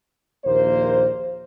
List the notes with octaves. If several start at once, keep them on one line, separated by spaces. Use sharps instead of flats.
A#1 D#2 A#3 C5